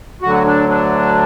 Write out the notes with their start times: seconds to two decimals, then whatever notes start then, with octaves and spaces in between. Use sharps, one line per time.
0.22 D2 D3 F#3 F#4
0.45 D4
0.69 D4